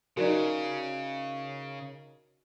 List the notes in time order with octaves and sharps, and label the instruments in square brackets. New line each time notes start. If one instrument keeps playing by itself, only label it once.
[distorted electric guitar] C#3 [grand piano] D#4 A#4 [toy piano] F#4 C5 D5